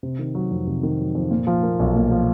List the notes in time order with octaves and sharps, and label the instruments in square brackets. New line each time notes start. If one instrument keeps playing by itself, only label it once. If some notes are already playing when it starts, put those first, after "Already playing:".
[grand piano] C3
D#3
F#3
F2
C3
D#3
F#3
F2
A#2
F3
A#3
B1
A#2
F3